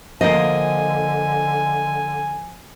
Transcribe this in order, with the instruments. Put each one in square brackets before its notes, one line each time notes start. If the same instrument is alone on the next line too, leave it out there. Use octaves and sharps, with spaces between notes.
[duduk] D3 [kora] F3 A#3 C5 [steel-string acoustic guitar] D#5 [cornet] G#5